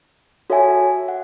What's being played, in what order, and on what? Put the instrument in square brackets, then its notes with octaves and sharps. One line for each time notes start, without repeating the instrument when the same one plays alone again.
[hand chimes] F#4 A4 C#5 E5 G#5
F#5